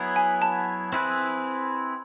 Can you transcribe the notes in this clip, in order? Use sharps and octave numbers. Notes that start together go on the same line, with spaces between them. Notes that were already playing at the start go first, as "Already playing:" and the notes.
Already playing: F#3 B3 E4 G#4
G#5
A5
C4 E4 G#4 B4